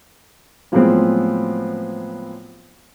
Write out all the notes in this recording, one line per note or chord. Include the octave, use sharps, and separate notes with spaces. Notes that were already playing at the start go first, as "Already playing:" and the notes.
A2 F3 F#3 G#3 B3 C4